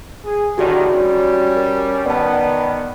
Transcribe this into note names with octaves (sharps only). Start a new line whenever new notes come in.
G#4
A2 D3 D#3 F#4 G4 D5
G3 C#4
A#4
D#3 B3 D5 A5